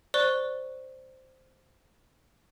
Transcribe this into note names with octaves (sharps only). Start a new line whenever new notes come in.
C5 D5 C#6 F#6 G7